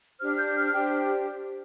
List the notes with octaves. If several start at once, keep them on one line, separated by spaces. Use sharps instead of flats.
D4 G4 C5 F6
G6
F6
D4 G4 C5 G5